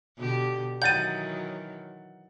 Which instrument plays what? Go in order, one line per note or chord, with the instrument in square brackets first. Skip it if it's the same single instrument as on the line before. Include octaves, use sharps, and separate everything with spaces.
[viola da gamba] B2 D3 G4
[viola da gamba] D#3 E3 F#3 [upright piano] F#5 A6 [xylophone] G6 D#7